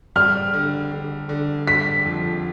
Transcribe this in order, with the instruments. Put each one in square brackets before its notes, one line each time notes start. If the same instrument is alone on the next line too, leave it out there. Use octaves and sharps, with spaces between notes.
[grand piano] G3 [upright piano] F6
[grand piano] D3
D3
D3
[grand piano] G3 [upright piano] B6
[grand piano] F2